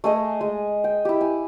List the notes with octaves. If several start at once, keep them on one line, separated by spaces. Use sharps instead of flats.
A3 G#4 D#5 G#5
G#3
G5
E4 G4
G#5